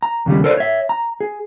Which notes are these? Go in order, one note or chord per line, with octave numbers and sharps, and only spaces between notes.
A#5
D#2 C#3 G3
A4 A#4 C5 D5
C#5 E5
A#5
G#4